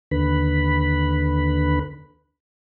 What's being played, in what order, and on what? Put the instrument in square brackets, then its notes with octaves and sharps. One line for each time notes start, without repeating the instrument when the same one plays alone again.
[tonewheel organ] D#2 D3 B4 B5